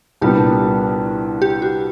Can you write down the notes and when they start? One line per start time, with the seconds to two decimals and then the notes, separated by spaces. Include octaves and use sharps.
0.22 C2 A#2 G3 B3 D4 G4
1.42 G4
1.62 F#4